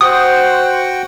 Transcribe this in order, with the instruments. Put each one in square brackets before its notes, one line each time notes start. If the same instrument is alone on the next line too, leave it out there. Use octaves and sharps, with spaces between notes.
[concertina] F#4 F#5 G5 [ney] C5 [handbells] D#6